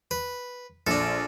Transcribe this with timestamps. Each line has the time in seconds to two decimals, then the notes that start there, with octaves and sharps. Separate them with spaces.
0.11 B4
0.87 A#1 D4 A4